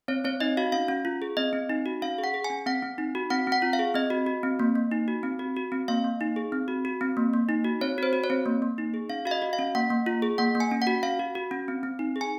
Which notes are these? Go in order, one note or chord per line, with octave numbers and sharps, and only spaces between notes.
C4 C#5
C4 C#5
D#4 D#5
F#4 F5
C#4 F5
C#4
F4
G#4
C4 D#5
C4
D#4
F#4
C#4 F5
G#4
F#5
G#4
G#5
C#4
C4 F#5
C4
D#4
F#4
C4 F#5
C4
F#5
F4
F5
G#4
C4 D#5
F#4
F#4
C4
A#3
A#3
D#4
F#4
C4
F#4
F#4
C4
A#3 F5
A#3
D#4
G#4
C4
F#4
F#4
C4
A#3
A#3
D#4
F#4
C4 C#5
F#4 C5
F#4
C#5
C4
A#3
A#3
D#4
G#4
C#4 F5
F#4 F5
D#5
F#4
F5
C#4
A#3 F#5
A#3
F4
G#4
A#3 F#5
A#3
G#5
C#4
F#5
F#4
C#4 F5
F#4
F#4
C#4
C4
C4
D#4
G#4
G#5